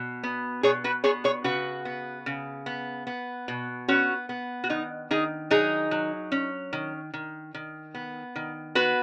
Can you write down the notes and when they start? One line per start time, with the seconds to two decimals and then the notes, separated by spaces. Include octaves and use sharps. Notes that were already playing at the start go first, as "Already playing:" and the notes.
Already playing: B2
0.23 B3
0.63 B2 G#4 C#5
0.84 F#4 B4
1.04 B3 G#4 C#5
1.24 G#4 C#5
1.44 C#3 F#4 B4
1.85 B3
2.26 C#3
2.66 B3
3.07 B3
3.48 B2
3.88 B3 C#4 F#4
4.29 B3
4.64 F#4
4.69 D#3 D#4
5.11 D#3 D#4 G#4
5.50 F#3 D#4 G#4
5.91 F#3
6.32 C#4
6.73 D#3
7.14 D#3
7.54 D#3
7.94 B3
8.36 D#3
8.75 B3 F#4 B4